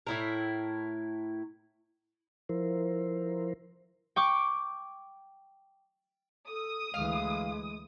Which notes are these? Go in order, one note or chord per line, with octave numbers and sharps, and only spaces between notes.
A2 E4 A#4
F3 E4 A#4 C5
G5 C#6 D6
A4 D#6
D2 E3 G#3 F5